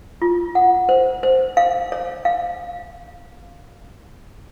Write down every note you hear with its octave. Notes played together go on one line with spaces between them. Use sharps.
F4
F#5
C5
C5
F5
C#5
F5